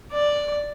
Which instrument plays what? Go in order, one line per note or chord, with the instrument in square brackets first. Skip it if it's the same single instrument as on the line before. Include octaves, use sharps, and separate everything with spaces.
[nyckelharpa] D5